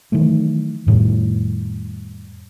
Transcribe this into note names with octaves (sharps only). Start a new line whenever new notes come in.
D#3 E3 F#3 A3
F2 A2 D#3 G3